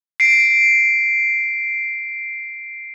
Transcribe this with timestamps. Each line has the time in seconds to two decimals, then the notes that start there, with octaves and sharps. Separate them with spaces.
0.20 C7 D7